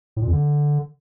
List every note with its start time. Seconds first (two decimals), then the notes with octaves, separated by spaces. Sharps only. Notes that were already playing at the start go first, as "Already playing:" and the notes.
0.17 A2
0.22 A#2
0.27 F2
0.33 D3